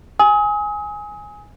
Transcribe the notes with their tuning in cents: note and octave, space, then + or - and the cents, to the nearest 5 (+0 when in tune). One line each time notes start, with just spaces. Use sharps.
G#5 +0 D#6 +35